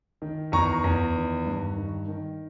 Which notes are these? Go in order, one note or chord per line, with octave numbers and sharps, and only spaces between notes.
D#3
E2 A#5 C#6
E2
D#3
G2
D#3
D#3